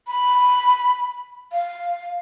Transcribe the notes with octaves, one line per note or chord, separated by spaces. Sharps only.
B5
F5